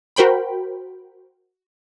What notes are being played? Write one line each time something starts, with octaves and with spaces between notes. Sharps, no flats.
F#4 A#4 C5 G5 B5